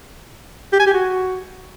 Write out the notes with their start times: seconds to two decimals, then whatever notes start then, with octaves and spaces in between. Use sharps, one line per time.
0.73 G4
0.80 G#5
0.87 G4
0.93 F#4